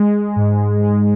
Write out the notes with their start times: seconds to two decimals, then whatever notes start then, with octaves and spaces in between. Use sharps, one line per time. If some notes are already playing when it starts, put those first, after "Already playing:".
Already playing: G#3
0.36 G#2
0.82 G#3